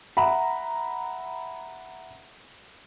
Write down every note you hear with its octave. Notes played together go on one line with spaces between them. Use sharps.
E5 F#5 A#5 B5